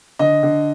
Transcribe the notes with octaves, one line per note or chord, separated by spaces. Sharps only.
D3 D#5
D3